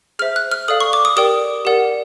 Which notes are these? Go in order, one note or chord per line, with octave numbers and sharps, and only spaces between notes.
G#4 C5 E5 F6
F#6
F6
A4 D5 F5 D#6
C#6
D6
D#6
G4 A#4 D5 G5 D#6
G4 A#4 D5 F#5